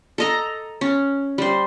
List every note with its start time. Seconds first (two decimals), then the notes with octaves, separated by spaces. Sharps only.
0.18 A4 D#5 A#5
0.81 C#4
1.38 G3 C5